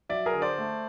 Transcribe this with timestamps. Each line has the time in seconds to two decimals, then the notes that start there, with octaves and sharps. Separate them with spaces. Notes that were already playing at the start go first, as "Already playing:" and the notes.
0.09 F#3 D5 E5
0.26 G#4 A#4
0.34 D3
0.42 C5 D5
0.58 A3